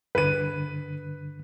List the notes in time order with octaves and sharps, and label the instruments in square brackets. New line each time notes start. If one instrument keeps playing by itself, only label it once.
[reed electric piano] G2 D3 [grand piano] B4 D#7